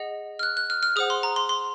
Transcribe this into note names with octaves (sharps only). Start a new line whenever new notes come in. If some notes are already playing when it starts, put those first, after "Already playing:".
Already playing: G#4 D#5 F#5
F6
F#6
F#6
F6
F6
G#4 C5 F#5 D#6
C6
A#5
C6
C6